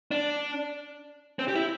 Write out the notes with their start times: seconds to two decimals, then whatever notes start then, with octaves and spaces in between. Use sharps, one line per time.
0.11 D4
1.39 C4
1.48 G4
1.55 E4